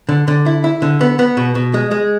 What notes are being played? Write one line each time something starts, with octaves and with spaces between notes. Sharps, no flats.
D3
D3
E4
E4
D3
B3
B3
B2
B2
G#3
G#3